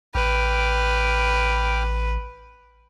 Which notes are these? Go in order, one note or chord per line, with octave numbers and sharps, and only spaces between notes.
A1 B4 G5 D6 F6